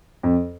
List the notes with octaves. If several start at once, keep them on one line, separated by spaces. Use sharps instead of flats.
F2